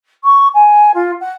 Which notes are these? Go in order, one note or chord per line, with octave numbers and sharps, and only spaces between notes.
C#6
G#5
F4
F#5